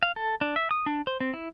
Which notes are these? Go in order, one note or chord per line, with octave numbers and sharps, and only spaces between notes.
F5
A4
D4
E5
D#6
D4
C5
C4
E4